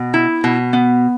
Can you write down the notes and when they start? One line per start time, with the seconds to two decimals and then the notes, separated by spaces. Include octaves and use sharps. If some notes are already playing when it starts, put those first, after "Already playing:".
Already playing: B2
0.14 E4
0.44 B2
0.73 B3